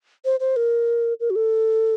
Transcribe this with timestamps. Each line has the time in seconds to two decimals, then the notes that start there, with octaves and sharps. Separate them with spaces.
0.25 C5
0.40 C5
0.56 A#4
1.20 A#4
1.30 F#4
1.36 A4